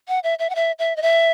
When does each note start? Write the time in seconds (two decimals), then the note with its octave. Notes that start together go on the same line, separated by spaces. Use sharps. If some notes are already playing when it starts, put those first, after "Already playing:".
0.08 F#5
0.24 E5
0.39 E5
0.50 F#5
0.55 E5
0.79 E5
0.97 D#5
1.02 E5